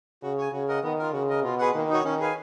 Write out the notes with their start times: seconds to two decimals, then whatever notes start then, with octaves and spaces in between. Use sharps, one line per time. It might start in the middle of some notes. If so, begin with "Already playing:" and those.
0.22 C#3 F#4
0.38 C#5 G#5
0.53 C#3 F#4
0.68 A#4 D#5 F#5
0.83 D#3 B3
0.99 F4 A#4
1.13 C#3 F#4
1.29 A#4 D#5
1.44 B2 F4
1.59 G#4 B4 F#5
1.74 D#3 A#3
1.90 D#4 F#4 C#5
2.05 D#3 C#4
2.20 G#4 B4 F5 G#5